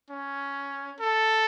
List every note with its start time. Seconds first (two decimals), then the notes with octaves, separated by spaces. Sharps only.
0.10 C#4
1.00 A4